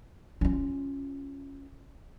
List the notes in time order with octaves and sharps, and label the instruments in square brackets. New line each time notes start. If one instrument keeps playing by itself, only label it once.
[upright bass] C#4 F4